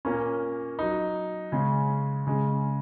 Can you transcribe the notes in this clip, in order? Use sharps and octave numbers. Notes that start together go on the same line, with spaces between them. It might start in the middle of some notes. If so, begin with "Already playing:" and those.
A#2 A#3 C#4
F#3 D#4
C#3 G#3 C#4
C#3 G#3 C#4